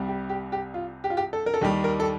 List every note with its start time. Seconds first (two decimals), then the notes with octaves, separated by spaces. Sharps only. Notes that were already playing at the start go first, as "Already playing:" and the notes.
Already playing: C2 C3 G3
0.08 G4
0.29 G4
0.52 G4
0.74 F4
1.04 G4
1.10 F4
1.17 G4
1.33 A4
1.46 A#4
1.54 A4
1.61 D#2 D#3 G3 G4
1.84 A#4
2.00 A4